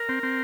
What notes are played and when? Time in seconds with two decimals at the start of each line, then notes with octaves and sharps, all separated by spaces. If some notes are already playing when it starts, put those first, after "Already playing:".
Already playing: A#4
0.09 C4
0.23 C4